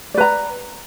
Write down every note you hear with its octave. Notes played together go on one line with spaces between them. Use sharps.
B4 D5 A#5